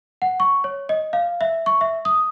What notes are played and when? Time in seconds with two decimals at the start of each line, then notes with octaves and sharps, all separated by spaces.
0.22 F#5
0.40 C#6
0.64 C#5
0.89 D#5
1.13 F5
1.41 E5
1.66 C#6
1.81 E5
2.05 D#6